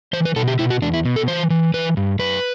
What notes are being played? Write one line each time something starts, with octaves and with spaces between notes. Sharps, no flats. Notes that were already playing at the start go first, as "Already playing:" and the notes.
E3 C5
B4
B2 A4
G4
B2 E4
F#4
E2 D4
E4
B2
A4
E3 C5
E3
E3 B4
G2
F#2 B4